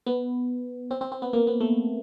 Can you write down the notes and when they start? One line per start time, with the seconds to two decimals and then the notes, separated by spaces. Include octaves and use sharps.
0.07 B3
0.91 C4
1.01 C4
1.12 C4
1.22 B3
1.33 A#3
1.47 B3
1.60 A3